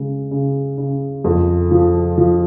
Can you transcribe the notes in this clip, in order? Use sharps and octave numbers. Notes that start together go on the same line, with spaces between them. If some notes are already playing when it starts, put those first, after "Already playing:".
Already playing: C#3 G#3
C#3
C#3
F2
F3
F3